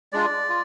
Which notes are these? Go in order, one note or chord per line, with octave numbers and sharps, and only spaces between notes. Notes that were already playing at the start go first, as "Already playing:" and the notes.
G#3 D4 F4 D5
F4